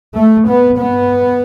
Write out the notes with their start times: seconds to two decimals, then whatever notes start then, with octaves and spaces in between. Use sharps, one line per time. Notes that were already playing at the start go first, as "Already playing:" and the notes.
0.17 A3
0.48 B3
0.78 G2 B3